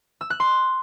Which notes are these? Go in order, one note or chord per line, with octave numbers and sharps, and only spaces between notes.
E6
F#6
C6